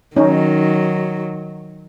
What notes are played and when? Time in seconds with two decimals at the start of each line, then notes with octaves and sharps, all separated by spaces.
0.17 D#3 F#3 C#4 D#4